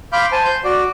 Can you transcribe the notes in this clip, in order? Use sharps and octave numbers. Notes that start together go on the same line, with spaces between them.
F5 B5 C6 D6 F6 G6
C5 G#5 A5
C6 G6
F#4 D5